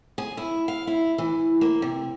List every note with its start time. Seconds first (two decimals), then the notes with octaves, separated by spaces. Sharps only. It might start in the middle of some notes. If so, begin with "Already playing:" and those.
0.18 G#4
0.37 E4
0.68 F5
0.87 E4
1.18 E3
1.61 A#3
1.82 C3